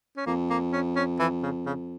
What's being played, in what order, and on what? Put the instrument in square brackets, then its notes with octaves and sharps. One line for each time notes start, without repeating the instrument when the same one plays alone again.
[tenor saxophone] C#4
[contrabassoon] F2 [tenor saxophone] A#3
[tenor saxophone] A#3
C#4
C#4
E3
C#3
C#3